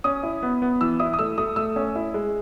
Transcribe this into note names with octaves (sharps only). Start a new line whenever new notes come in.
C#4 D#6
E4
B3
B3
E3 E6
E4 D#6
D#6
A3 E6
A3 D#6
A3 E6
C#4
E4
G#3